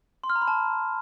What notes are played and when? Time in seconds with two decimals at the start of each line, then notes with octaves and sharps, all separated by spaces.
0.24 C6
0.30 F6
0.36 A#5
0.42 B5
0.48 A5